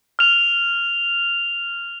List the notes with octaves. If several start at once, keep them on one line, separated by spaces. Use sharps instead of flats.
F6 F7